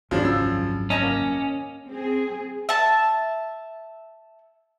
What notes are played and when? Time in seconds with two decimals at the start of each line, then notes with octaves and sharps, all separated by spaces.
0.11 G#1 C#2 F#2 C#3 F3 F#3 D4
0.25 E6
0.90 C#4 D#5 A5 G#6 A#6
1.02 A#3
1.91 C4 G#4
2.69 E5 A5